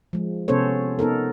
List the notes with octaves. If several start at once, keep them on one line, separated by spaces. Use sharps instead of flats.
F3 G#3
C3 B3 C#4 A4 C5 C#5
B3 D#4 A4 A#4